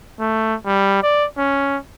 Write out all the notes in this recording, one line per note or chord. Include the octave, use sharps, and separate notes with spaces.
A3
G3
D5
C#4